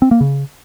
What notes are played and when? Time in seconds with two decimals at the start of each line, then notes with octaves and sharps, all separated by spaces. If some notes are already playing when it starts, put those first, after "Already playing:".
0.02 C4
0.11 A#3
0.21 C#3